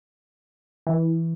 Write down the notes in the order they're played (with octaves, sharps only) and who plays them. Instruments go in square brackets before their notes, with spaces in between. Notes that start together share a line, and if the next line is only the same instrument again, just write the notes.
[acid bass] E3